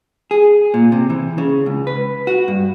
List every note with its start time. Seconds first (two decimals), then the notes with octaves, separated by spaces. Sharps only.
0.31 G#4
0.74 A#2
0.92 C3
1.10 E3
1.38 C#3
1.66 C#2
1.87 B4
2.27 F#4
2.48 G2